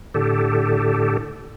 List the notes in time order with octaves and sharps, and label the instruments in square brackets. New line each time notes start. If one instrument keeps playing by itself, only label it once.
[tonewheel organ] A2 D3 G4 A4